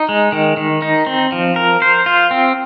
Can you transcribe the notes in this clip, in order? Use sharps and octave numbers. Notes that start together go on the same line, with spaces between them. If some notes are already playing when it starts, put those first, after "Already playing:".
Already playing: D#4
G#3
D#3
D#3
D#4
C4
F3
A#4
C5
F4
C4